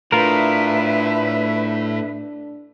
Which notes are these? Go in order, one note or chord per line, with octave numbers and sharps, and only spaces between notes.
A2 D4 F4 A#4 B4 E5